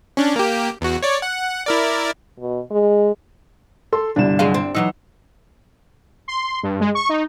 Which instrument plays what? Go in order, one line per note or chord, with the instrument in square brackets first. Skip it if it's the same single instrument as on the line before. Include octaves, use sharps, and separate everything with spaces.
[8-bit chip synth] C#4 D4
A#3 G4
E2 F#4
C#5 D5
F#5
E4 A#4 D5
[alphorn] B2
G#3
[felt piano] A4 [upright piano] C6
[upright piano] G1 C2 E7 [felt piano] D4
[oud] F#3 G#3 F5
C4
[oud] E3 F#3 D#4 [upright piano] E6
[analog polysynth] C6
G2
G#3
C#6
D#4